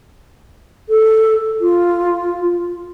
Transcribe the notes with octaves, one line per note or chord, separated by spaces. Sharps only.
A4
F4